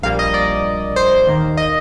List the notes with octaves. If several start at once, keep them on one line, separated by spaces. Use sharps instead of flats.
A#1 A#2 G3 A#3 F5
D#5
D5
C5
D#2 D#3 A#3
D#5